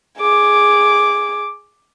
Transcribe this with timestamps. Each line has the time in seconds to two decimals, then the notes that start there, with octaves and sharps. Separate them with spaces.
0.19 G#4 D6